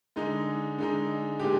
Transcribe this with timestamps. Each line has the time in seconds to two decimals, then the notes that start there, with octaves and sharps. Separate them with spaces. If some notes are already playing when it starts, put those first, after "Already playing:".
0.16 D3 G#3 D#4
0.78 D3 G#3 D#4
1.40 A#2 G#3 D4 G4